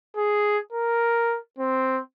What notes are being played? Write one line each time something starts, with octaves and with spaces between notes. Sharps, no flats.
G#4
A#4
C4